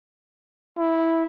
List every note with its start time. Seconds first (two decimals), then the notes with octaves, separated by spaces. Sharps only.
0.78 E4